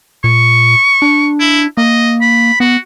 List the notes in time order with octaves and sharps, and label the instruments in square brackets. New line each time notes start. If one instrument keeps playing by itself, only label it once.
[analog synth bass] A#2 [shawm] C#6
[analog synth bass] D4
[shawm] E4
[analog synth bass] A#3 [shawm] D#5
[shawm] B5
[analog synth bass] B3 [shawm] F#4